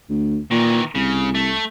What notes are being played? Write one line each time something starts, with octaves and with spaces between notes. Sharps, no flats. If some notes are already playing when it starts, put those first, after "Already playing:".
D2
A#2 D#3 E3
C2 C#3
A3